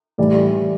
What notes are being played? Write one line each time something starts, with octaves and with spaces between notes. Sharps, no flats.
A2 E3 G3 D5